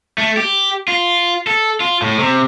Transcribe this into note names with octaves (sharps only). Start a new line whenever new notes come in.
A3
G4
F4
A4
F4
A2
C3